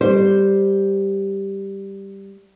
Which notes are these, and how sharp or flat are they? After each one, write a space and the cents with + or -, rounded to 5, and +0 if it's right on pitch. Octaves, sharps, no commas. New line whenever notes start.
G3 +0 C5 +0